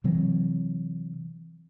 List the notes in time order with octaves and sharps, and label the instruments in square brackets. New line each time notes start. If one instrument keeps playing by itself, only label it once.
[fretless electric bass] C3 E3 F#3 C4